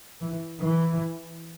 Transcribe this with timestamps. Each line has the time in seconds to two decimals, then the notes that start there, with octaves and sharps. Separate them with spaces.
0.21 E3
0.62 E3